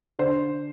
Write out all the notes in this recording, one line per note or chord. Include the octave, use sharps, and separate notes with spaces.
D3 C5